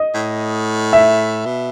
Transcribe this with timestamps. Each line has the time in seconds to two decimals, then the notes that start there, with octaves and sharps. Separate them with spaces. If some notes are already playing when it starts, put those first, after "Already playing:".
Already playing: D#5
0.14 A2
0.93 E5
1.45 B2